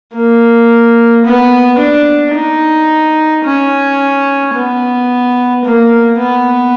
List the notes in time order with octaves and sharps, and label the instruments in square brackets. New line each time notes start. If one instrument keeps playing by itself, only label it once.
[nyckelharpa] A#3
B3
D4
D#4
C#4
B3
A#3
B3